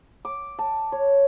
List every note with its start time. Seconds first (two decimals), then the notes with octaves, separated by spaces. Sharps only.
0.25 D6
0.59 A5
0.92 C#5